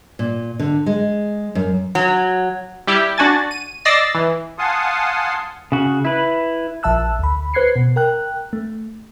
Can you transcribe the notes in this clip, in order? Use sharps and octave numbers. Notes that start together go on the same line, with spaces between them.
A#2
D3
G#3
F#2
F#3
G3 E4 G4
D4 F#4 G#5 A6
D#7
D5 D#5 E6 A6 A#6 C7
E3
F5 F#5 G#5 A5 C6 D#6
C#3 F#4
E4 B4
A#1 F3 E5 A5 E6 F#6
D2 B5
B4 C5 F#6 G#6 C7 C#7
B2
A#4 G5 F#6
A3